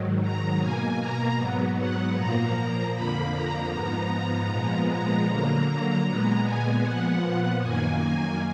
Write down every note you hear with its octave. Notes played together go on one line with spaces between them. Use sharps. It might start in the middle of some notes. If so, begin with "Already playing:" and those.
Already playing: G#2 D#3 F#3
A#5
B2 A#3 G#5
A#5
G#2 F#3 B3
F#5
A#2 F3 A#3 A#5
F2 D3 F3 A#3 B5
A#5
G#2 F3 B3 A#5
A#2 F3 G#3 B3
A#5
D3 F#3 A#3 A#5
A#5
A#2 G#3 B3 A#5
G#5
A#2 F3 B3 F#5
F#2 D#3 A#3 G#5
G#5